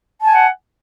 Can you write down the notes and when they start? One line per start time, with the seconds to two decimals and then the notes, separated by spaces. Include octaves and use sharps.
0.22 A5
0.27 G#5
0.32 F#5